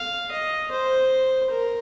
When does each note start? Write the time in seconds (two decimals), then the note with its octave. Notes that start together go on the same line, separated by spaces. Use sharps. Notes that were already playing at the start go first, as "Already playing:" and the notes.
Already playing: F5
0.31 D#5
0.71 C5
1.51 A#4